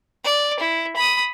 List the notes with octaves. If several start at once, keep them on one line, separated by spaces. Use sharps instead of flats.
D5
E4
B5 D#6